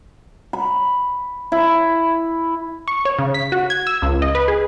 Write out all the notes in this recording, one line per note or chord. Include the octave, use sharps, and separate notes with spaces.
B5
E4
C#6
C#5
C#3
B6
F#4
G#6
E6
C#2
D#5
B4
G#4